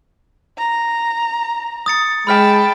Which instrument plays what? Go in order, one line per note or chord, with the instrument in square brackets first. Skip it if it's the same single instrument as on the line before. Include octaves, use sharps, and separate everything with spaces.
[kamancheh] A#5
[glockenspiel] D#6 A6 C#7
[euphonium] G#3 [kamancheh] G5 A5 [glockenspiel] B5 F6 B6